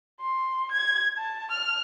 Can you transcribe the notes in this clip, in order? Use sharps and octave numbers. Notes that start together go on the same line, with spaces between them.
C6
G#6
A5
F6